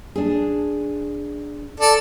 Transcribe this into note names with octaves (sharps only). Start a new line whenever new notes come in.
D4 G#4
A4 D5